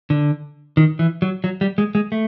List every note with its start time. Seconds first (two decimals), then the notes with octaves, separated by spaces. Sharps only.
0.10 D3
0.77 D#3
0.99 E3
1.22 F#3
1.44 F#3
1.61 G3
1.78 G#3
1.95 G#3
2.12 A3